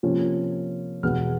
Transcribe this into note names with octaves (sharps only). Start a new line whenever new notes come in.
C3 F3 A#3 C#4
E2 B2 G#3 B3 F6